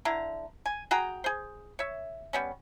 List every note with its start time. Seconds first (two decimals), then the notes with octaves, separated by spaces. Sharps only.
0.05 D3 E4 A#5
0.66 G#5
0.91 F#4 G#4 G5 A#5
1.24 G#4 C5
1.79 C#5 E5
2.33 G3 B3 C#4